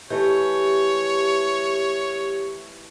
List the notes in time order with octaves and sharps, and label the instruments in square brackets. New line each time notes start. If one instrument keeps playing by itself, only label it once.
[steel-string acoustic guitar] E3 A3 [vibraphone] G4 [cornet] C#5